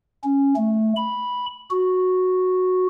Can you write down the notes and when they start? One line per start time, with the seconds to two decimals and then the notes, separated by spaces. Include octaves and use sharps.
0.24 C#4
0.56 A3
0.97 B5
1.71 F#4